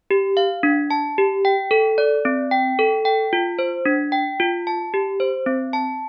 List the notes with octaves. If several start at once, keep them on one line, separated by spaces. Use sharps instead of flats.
G4
F5
D4
A5
G4
G5
A4
D5
C4
G5
A4
G5
F4
C5
D4
G5
F4
A5
G4
C5
C4
A5